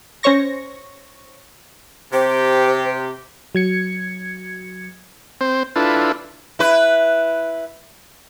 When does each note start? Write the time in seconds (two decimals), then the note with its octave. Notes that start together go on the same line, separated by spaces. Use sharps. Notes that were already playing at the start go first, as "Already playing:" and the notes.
0.23 C#4 C5 C#5 C#6 A#6
2.13 C3 G4 C5
3.55 F#3 G#6 C#7
5.41 C4 C5
5.76 D4 E4 F4 A4 B4
6.59 E4 B4